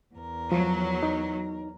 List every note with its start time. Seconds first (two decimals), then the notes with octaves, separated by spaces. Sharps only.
0.16 E2 A#4
0.52 F3 F#3
1.03 D#4